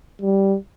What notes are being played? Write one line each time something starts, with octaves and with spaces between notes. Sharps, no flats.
G3